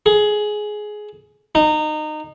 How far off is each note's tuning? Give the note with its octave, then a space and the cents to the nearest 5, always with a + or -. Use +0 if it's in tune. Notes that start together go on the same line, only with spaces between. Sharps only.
G#4 +15
D#4 -25